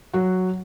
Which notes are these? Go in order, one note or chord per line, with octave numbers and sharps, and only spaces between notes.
F#3 F#4